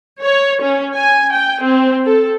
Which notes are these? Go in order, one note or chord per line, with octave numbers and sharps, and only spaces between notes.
C#5
C#4
G#5
G5
C4
A4